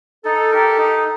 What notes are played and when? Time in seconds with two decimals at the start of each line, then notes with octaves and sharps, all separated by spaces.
0.24 D#4 A4
0.51 G4 A#4
0.77 D#4